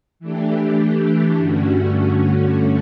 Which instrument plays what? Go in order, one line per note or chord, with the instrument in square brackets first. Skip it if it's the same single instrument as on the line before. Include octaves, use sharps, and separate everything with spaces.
[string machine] E3 A3 D4 G4
G2 D3 A3 C#4 F#4